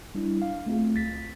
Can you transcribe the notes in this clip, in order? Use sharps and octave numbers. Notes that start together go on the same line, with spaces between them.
G3 D4 E4
F5
A3 C4 F4 G#4
C#2 A6 B6